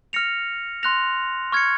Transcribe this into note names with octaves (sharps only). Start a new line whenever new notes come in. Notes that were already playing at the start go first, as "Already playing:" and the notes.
F6 A#6 C#7 F7
C6 F#6 A#6 F7
C#6 F6 G#6 C#7